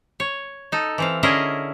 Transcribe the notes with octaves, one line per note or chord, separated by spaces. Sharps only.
C#5
D#4 A4
E3 C4 F5
D3 C#4 E4 G#4 A#4 D#5